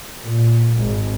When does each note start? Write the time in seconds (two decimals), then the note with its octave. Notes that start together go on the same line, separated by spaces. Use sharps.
0.22 A#2
0.76 G#1